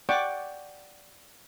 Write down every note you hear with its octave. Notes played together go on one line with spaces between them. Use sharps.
D5 F#5 G5 C#6 D6